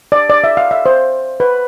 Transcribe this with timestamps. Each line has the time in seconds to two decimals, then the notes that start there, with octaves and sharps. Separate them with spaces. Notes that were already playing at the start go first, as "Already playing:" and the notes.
0.12 D5
0.30 D5
0.44 E5
0.57 F5
0.71 E5
0.86 C5
1.40 B4